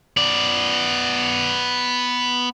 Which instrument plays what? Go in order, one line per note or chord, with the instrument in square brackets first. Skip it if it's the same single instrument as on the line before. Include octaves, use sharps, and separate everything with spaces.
[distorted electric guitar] B3 D5